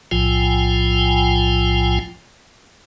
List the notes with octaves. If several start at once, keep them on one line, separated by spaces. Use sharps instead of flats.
B1 A2 F3 F4 G5 G#5